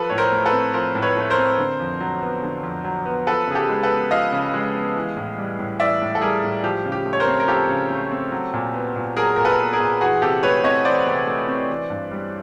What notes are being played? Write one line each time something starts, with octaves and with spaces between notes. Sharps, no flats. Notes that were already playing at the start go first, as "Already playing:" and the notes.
Already playing: F3 A4 B4
A2 C#5
A#4 C5
A3
A4 B4
C4
F3 A#4 C5
A2
B4 C#5
A3
A#4 C5
C4
D3
F2
F#3
B3
D3
F2
F#3
B3
F3 A4 B4
C#3 G#4
G4 A4
G#3
A4 B4
B3
F3 D#5 F5
C#3
G#3
B3
E3
A2
G3
A2
E3 D5 E5
A2
A4
G3 G#4 A#4
A2
F3 G4
C#3
G4
A3
C#5
A#4 C5
C4
A#4
F3 G4 A4
C#3
A3
C4
F#3
A#2
B3
A#2
F#3 G#4 A#4
A#2 A#4
A4 B4
B3
G#4 A#4
A#2
E3 F#4 G#4
C3 G4 A4
A3 B4 C#5
C4 C#5 D#5
E3 C5 D5
C3
A3
C4
E3
G2
G3